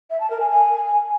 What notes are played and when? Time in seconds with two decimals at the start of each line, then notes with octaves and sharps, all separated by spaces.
0.10 E5
0.20 A5
0.30 A#4
0.40 G#5
0.50 G#5